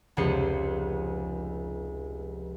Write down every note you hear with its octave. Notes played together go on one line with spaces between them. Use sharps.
F1 C#2 F3 G#4 C5 C#7